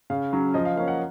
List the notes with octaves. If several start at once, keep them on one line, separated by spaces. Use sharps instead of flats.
C#3 F5
F#3 C#4
F3 D#5
F5
A#3 C#4 F5
F#5